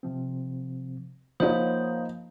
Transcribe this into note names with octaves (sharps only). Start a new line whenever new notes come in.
C3 F3 C4
F3 A#3 D#4 C5 C#5 F#5 D#6